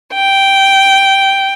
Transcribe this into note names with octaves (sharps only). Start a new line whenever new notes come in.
G5